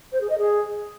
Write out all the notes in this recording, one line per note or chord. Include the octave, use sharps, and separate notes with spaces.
C5
G#4
D#5
G#4